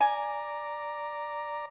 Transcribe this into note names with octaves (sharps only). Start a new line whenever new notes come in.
D5 G#5 A#5